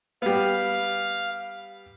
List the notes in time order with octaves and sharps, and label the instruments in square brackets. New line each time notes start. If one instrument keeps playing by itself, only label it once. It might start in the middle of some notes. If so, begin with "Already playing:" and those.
[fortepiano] G3 B3 [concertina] F5